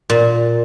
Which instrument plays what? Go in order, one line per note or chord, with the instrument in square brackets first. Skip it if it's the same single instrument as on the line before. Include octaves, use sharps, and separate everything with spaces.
[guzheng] A#2